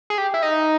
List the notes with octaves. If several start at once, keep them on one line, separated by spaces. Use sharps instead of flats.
G#4
G4
E4
D#4